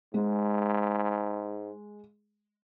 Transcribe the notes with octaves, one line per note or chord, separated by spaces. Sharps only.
G#2 G#3